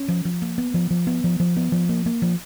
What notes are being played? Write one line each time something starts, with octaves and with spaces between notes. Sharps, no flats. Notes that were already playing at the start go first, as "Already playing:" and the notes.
Already playing: C#4
F3
F3
A#3
B3
F3
F3
B3
F3
F3
B3
F3
A#3
A#3
F3